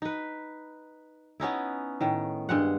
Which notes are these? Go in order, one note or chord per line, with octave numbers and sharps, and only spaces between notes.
D#4 B4
B3 C#4 D#4 E4
A2 D#3
G2 G#3 F#5